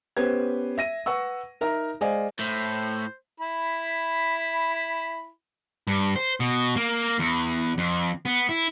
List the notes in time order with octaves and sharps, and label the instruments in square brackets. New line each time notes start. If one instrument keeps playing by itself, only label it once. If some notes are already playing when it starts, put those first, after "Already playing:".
[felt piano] B3 C#4 G4 B4 C5 G#6
E5 A#6 D#7
B4 F#5 C#6 E6
D#4 A#4 E5 A#5
G#3 C5 D5 D#5 F5 G#5
[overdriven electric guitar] A2 [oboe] C5
[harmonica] E4 B5
[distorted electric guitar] G2
C5
B2
A#3
E2
F2
B3
E4